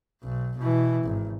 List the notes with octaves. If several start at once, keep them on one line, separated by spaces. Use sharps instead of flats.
B1
B2 E3
G#1